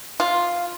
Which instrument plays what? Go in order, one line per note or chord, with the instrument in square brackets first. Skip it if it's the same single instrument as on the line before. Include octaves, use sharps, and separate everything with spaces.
[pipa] F4